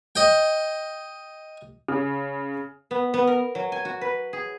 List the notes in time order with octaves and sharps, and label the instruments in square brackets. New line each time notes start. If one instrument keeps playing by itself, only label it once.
[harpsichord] D#5 G5
[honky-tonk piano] C#3
[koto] B3
B3
A#4
F#3
G#5
F#4
B4
G#4